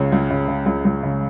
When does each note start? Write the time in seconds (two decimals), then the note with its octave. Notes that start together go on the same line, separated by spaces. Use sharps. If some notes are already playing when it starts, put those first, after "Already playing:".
Already playing: C#2 C#3 C#5
0.12 C#2
0.30 C#3
0.48 C#3
0.66 C#2
0.85 C#2
1.03 C#3